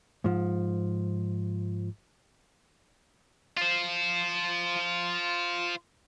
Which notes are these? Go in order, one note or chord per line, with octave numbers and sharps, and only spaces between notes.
G#2 F3
F4 C5